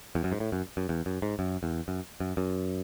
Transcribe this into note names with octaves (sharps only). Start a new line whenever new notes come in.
E2
F#2
G#2
A2
F#2
F#2
E2
F#2
G#2
F#2
E2
F#2
F#2
F#2